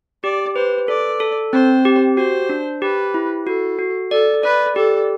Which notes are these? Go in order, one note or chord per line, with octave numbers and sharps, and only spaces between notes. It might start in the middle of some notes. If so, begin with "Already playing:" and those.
G4 D5
B4 C5
A4 D5
A4
C4 C5
G4
F#4 C5
D4
G4 B4
E4
F#4 A4
F#4
A4 D5
B4 D5
G4 A4